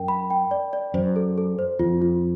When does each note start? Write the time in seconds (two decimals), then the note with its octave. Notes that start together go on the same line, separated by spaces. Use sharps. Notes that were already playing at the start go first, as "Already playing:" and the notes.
Already playing: F#2 A#4 G5
0.08 B5
0.30 G5
0.51 D5
0.73 D5
0.94 F#2 C5
1.16 A4
1.38 A4
1.59 C5
1.79 F2 F4
2.02 F4